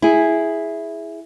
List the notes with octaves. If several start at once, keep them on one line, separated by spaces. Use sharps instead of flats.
E4 G#4